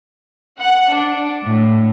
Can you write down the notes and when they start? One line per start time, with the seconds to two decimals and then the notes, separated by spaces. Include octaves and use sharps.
0.59 F#5
0.92 D4
1.46 A2